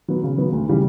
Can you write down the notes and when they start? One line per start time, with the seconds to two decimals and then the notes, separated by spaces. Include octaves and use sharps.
0.08 F#3 B3
0.23 C#3
0.38 F#3 B3
0.52 D2
0.68 C#3 E3 G3